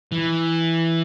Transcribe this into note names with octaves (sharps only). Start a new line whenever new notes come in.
E3